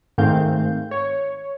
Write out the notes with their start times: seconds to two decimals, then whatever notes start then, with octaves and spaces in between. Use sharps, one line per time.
0.18 G#2 D#3 A3 C4 F5 G6
0.91 C#5